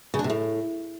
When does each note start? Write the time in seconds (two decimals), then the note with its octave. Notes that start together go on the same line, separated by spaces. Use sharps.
0.14 C#3
0.19 D4
0.24 C3
0.30 A2